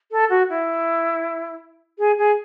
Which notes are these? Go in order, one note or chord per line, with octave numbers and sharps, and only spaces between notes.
A4
F#4
E4
G#4
G#4